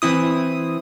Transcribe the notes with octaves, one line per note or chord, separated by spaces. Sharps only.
E3 C4 E4 D#6